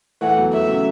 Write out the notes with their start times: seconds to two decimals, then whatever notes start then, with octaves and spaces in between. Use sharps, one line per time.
0.21 E3 A3 F#5
0.37 F#3 B3
0.53 E3 A3 E5
0.68 C#3 F#3